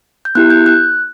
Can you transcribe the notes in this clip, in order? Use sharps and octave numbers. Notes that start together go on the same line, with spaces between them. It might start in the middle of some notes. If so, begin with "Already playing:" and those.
G6
B3 E4 G4 F#6
G6
F#6